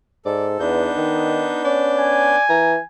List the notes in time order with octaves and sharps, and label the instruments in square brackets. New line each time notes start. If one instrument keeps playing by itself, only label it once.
[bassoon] G#2 [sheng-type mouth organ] A4 [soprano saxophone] D5
[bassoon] E2 [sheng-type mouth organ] B3 D4 G6 [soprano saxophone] D#4
[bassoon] D#3
[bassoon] C#4 [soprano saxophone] D5
[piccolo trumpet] G#5
[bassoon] E3 [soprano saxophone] A#5